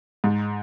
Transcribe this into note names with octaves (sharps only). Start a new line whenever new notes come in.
G#2